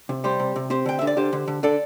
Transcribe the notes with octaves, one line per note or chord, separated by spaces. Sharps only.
C3
G3 G4 C5
C3
C3
C4 G4 C5
D3 G5
D3 E5
D5
D3 G4 C5
D3
D3
D3 A4 D5